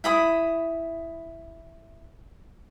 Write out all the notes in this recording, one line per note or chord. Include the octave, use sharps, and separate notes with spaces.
E4 B5 D#6